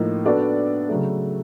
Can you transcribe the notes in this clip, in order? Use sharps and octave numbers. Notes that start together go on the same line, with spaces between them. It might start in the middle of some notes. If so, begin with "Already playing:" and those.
Already playing: A2 F3 A#3 D#4
B3 D4 F#4 A4 D5
C#3 F#3 A3